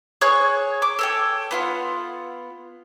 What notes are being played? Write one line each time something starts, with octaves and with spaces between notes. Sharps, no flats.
G#4 C#5 C#6 F#6
D6
A4 C#5 G5
B3 F4 F#5